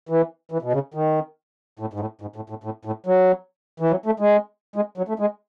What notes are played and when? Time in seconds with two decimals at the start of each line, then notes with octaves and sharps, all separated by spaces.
0.09 E3
0.52 E3
0.62 B2
0.73 C#3
0.94 D#3
1.79 A2
1.93 G#2
2.00 A2
2.21 G#2
2.36 A2
2.50 A2
2.64 A2
2.85 A2
3.06 F#3
3.80 E3
3.91 F#3
4.06 A3
4.20 G#3
4.76 G#3
4.98 F#3
5.08 A3
5.19 G#3